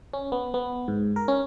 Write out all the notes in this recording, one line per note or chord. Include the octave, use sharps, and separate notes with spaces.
C#4
B3
B3
G#2
A#4
C#4